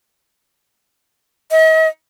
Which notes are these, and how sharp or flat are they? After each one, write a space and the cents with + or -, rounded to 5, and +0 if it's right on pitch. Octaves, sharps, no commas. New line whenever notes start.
D#5 +45